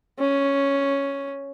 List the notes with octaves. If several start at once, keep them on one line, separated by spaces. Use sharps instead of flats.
C#4